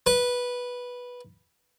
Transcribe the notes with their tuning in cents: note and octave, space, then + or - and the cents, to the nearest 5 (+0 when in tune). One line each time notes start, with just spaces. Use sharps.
B4 -10